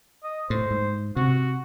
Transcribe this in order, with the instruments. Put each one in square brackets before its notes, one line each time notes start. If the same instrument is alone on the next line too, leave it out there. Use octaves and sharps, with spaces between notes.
[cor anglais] D#5
[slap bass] A2 [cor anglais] C5
[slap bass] G#2
[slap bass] C3 [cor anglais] F#4